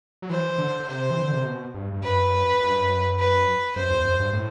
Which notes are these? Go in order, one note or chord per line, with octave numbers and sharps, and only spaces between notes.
F#3
E3 C5
D3
D3
C3 C5
E3
D3
C3
B2
G2
G2
F#2 B4
F#2
G2
F#2
B4
F#2 C5
E2
F#2
G2
A2